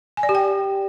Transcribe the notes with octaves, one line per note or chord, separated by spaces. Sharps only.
G#5
D5
G4
G5